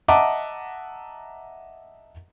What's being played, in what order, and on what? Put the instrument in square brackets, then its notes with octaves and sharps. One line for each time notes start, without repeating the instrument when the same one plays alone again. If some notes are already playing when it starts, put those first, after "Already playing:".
[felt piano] D#5 E5 F#5 A5 A#5 D6